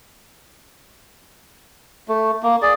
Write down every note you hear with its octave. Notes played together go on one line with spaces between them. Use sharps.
A3
A#3
G#4 D5